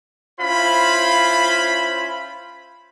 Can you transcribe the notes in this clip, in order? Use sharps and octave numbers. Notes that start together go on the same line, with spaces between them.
C#4 E4 F4 C5 B5